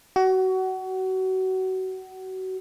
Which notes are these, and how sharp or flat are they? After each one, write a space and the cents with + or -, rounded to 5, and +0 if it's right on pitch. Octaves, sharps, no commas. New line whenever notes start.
F#4 +25